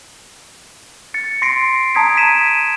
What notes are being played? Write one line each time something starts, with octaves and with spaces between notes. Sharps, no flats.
A6 C#7
C6 A#6 C7 D7
A5 A#5 D#6 G#6 B6 D7
B6 D#7 E7